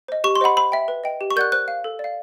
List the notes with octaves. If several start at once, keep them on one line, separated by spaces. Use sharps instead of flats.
C5 D#5
G4 C#6
C6
C5 D#5 F#5 B5
C5 B5
E5 G5
B4
D#5 G5
G4
C#6
A#4 D5 F#5 F#6 G6
C5 F#6
F5
A4
D5
F5